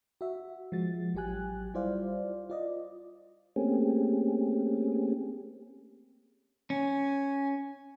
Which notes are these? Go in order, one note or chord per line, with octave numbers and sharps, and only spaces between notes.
F#4 E5
F3 G#3 F#4 A6
A1 F#3 G4 G#5 F#6
G3 E4 F4 C5 D5 F5
F4 D5 D#5
A3 A#3 C4 C#4 G4 G#4
C#4 G#5